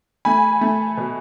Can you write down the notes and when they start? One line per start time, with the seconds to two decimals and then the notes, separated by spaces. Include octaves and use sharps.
0.25 A3 G#5 B5
0.61 A3
0.97 B2